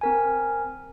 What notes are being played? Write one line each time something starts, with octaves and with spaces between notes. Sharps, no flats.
C4 A#4 G#5